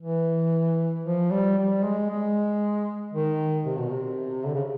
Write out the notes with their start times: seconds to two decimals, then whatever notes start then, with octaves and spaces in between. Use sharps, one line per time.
0.02 E3
1.05 F3
1.31 G3
1.58 G3
1.84 G#3
2.10 G#3
3.14 D#3
3.66 C3
3.78 B2
3.89 C3
4.46 D3
4.54 C#3